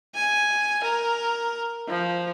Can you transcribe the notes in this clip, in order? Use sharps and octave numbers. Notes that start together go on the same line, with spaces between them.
G#5
A#4
F3